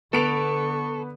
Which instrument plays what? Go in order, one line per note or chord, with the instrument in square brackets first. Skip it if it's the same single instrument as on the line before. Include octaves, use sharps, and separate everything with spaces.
[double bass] D3 [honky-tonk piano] B3 D7 F7 [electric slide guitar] A4 [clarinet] C#6